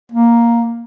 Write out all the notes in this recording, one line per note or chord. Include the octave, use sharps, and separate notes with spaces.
A#3